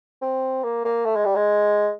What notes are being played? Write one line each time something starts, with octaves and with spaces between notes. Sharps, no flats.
C4
A#3
A#3
A3
G#3
G3
G#3